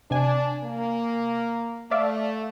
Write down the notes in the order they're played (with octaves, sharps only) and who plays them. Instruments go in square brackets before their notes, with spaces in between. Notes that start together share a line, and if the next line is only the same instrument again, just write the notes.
[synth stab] C3 G#5 [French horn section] D4
[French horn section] A#3
[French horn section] A3 [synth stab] D5 E5 F5